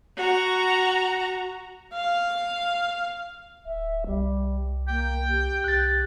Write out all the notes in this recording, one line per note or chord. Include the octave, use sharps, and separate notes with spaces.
F#4 A#5
F5
D1 E5
C2 G3
A#3 G5
G4
C2 F#6 A6